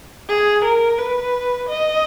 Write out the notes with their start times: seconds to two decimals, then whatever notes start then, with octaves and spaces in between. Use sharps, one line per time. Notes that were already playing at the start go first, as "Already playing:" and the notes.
0.28 G#4
0.64 A#4
0.99 B4
1.69 D#5